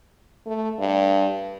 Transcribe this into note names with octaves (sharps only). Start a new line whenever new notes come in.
A3
G2